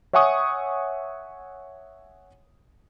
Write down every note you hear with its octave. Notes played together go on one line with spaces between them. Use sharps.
C#5 E5 F#5 G#5 C#6 D#6